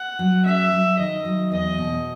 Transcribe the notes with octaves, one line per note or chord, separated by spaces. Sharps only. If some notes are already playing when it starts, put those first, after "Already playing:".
Already playing: F#5
F#3
C#4 E5
F#3
D#3 D#5
F#3
E2 D#5
B2